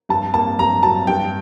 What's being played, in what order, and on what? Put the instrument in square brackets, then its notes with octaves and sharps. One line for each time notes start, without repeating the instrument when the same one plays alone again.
[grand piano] G2 [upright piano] A5
[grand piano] A#3 [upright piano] A5
[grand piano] G2 [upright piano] A#5
[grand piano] F#3 [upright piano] A5
[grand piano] G2 [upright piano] G5